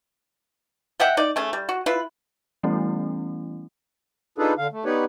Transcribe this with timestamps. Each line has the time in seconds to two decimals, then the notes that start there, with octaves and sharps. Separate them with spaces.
1.00 D#5 E5 F#5 G5
1.17 D#4 D5
1.36 A3 C#4 G#4
1.53 G3
1.69 F#4
1.86 E4 F4 B4
2.63 E3 G3 A3 B3 C#4 E4
4.38 D4 D#4 F4 G#4 A4 B4
4.58 D3 F5
4.72 A3
4.85 B3 D#4 G4 B4 C#5 D5